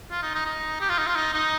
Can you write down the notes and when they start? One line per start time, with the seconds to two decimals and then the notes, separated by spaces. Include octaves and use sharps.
0.11 F4
0.23 D#4
0.35 D#4
0.46 D#4
0.81 G4
0.89 F4
0.98 D#4
1.07 F4
1.16 D#4
1.34 D#4